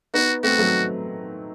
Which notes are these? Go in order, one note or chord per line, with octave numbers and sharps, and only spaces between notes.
B3 D#4 F#4
A3 C4 F#4
F#3 A3